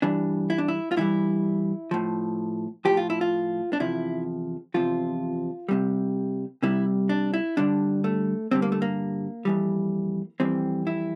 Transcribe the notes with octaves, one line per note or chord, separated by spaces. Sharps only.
G2 E3 G3 D4
E4
D4
E4
F4
G2 E3 G3 E4
A2 F3
A2 F3 G4
F4
E4
F4
D4
E2 C3 F3 E4
E2 C3 F3 F4
C2 C3 G3
C2 C3 G3 E4
D4
E4
G2 D3 G3 D4
A3
G2 D3 G3 C4
A#3
A3
A#3
F2 E3 G3
F2 E3 G3 C4
E4